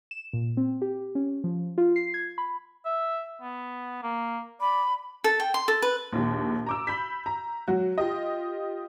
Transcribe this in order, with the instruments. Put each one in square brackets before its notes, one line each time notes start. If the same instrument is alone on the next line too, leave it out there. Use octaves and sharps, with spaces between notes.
[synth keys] E7
A#2
C4
G4
C#4
F3
F4
C7
G#6
B5
[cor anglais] E5
B3
A#3
[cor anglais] D5 [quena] B5
[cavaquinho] A4
G5
C6
A4
B4
[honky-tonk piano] A#1 D#2
A#5 D6 E6
B5 G6 B6
A#5
F#3 F#4
F4 G4 D#5